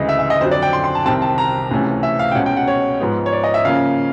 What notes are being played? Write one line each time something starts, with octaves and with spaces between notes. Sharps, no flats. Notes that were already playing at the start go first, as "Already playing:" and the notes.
Already playing: D2 C#3 E3 G#3 D#5
E5
E5
D#5
F2 D3 F#3 C5
D5
G5
C6
C6
A5
C2 C3 D#3 G3 C4 A5
A5
A#5
C#2 C3 E3 A3 C#4
E5
F5
G5
C#2 B2 G#3 C#4 F#5
G5
F#5
C#5
G#2 F3 G#3 B3
C#5
D5
D#5
E5
C#3 F3 A#3 C#4 F5